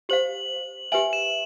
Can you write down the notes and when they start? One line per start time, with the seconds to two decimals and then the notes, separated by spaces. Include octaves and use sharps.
0.09 G4 C5 F5 F#7
0.92 G4 B4 E5 G#5 F#7
1.13 E7